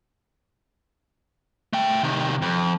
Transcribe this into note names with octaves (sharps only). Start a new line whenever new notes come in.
A3 G5
C3 D#3
F2